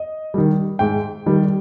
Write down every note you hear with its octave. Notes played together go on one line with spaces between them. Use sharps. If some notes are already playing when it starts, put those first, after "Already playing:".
Already playing: D#5
D#3 G3
G#2 G5
D#3 G3